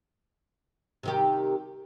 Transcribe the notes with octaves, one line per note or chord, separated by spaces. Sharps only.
C3 D#3 G4